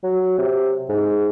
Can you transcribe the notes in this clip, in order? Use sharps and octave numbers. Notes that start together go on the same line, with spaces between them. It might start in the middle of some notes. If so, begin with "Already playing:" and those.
F#3
C3
G#2